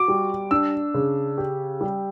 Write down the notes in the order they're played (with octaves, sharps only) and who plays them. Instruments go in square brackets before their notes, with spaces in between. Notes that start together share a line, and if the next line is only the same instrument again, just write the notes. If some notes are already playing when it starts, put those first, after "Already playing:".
Already playing: [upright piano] F#4 [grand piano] D6
[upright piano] G3
[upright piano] D4 [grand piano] E6
[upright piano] C#3
G4
G3